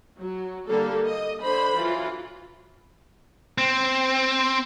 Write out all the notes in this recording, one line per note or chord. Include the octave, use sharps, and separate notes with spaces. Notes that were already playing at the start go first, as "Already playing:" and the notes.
F#3
D3 G3 A#3 A4
D#5
D3 C5 B5
E3 F#3 F4
C4